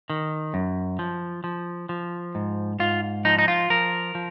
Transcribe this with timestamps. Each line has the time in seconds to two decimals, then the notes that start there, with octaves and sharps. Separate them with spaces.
0.10 D#3
0.54 F#2
0.99 F3
1.44 F3
1.89 F3
2.35 G#2
2.80 G#2 F4
3.25 F3 D#4
3.39 D#4
3.48 F4
3.70 F3 A#4
4.15 F3